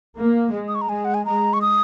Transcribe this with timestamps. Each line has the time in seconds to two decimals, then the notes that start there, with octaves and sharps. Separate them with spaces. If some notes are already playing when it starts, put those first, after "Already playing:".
0.17 A#3
0.54 G#3
0.68 D#6
0.75 C#6
0.81 A#5
0.89 G#3 G#5
1.05 F#5
1.14 G#5
1.25 G#3 A#5
1.53 C#6
1.61 D#6